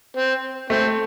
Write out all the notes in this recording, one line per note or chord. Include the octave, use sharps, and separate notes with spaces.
C4
A3 C4